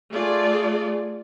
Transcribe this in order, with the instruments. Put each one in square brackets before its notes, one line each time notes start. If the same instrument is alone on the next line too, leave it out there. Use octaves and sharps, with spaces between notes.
[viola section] A3 F4 G#4 D5